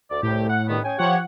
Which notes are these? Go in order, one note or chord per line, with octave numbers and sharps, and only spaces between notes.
D2 D5
C2 A2 G4
F#5
G2 D#3 B3
C#4 G5 G#5
F3 G4 C#5 F#5